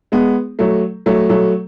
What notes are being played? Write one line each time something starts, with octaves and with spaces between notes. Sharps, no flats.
G#3 B3
F#3 A3
F#3 A3
F#3 A3